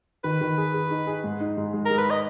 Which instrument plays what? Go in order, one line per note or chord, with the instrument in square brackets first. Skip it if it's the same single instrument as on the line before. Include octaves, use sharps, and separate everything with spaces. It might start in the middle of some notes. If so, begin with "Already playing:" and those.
[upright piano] D#3 [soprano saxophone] B4
[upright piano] D#3
G#4
G#4
D#4
G#4
G#2
D#4
G#2
G#3
[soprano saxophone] A#4
[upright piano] G#3
[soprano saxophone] B4
D#5